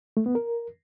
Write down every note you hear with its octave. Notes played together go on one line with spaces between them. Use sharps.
A3
B3
A#4